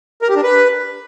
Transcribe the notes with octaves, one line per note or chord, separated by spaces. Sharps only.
A#4
G4
D4
B4